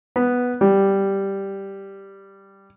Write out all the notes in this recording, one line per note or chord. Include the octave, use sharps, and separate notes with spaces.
B3
G3